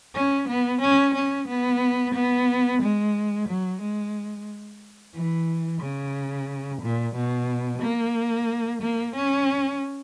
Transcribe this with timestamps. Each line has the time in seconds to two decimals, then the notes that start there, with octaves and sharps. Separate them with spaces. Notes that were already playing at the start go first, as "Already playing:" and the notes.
0.15 C#4
0.48 B3
0.81 C#4
1.14 C#4
1.47 B3
2.14 B3
2.82 G#3
3.48 F#3
3.81 G#3
5.14 E3
5.81 C#3
6.81 A#2
7.15 B2
7.82 A#3
8.82 A#3
9.15 C#4